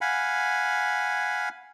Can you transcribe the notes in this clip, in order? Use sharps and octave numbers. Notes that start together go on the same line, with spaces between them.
F5 F#5 G#5 B5